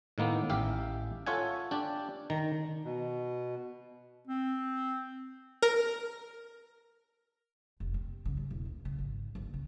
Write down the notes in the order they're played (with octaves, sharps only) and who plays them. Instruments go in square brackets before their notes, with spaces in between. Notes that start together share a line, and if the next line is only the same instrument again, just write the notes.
[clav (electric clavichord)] A2 D#3 A#3 B3
A1 G4 E5 F5 G5
F4 A4 C#5 E5 F#5 G#5
D4 G4 D5
D#3 A#5
[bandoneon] B2
[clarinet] C4
[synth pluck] A#4
[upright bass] F1
C4
C#3
G1
E1
C3
C#3
G#1
G1
C#3